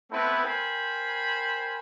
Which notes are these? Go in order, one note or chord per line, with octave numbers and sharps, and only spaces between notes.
A3 B3 C4 E4 B4
A#4 C5 G5 G#5 B5